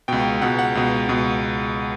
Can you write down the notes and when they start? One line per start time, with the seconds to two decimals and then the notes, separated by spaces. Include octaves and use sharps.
0.08 C#2 B2 G5
0.42 C#2 B2 F#5
0.59 F#5
0.75 C#2 B2
1.09 C#2 B2